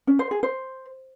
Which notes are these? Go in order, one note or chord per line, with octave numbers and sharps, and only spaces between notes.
C#4
C5
G#4
C5